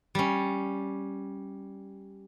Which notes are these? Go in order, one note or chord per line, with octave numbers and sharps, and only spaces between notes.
G3 C#4